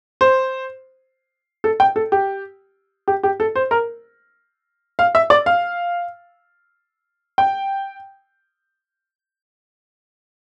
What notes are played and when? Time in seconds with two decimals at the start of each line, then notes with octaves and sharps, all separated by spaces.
0.21 C5
1.64 A4
1.80 G5
1.96 A4
2.12 G4
3.08 G4
3.23 G4
3.40 A4
3.55 C5
3.71 A#4
4.99 F5
5.15 E5
5.30 D5
5.46 F5
7.38 G5